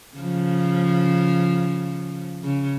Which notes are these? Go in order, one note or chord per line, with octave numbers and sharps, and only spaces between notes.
C#3 F3
C#3